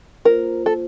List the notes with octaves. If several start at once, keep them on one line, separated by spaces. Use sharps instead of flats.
A#3 F4 A#4 C5
A4